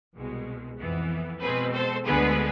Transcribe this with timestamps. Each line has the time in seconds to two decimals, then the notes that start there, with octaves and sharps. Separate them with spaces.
0.16 C2 B2 G#3
0.79 F2 E3 B3
1.42 B2 G#3 C4 G#4 B4
1.73 A4 C5
2.05 D2 D3 G#3 B3 G#4 B4